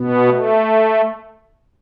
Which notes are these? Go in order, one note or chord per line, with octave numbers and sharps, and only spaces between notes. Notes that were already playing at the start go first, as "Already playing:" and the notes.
Already playing: B2 B3
A3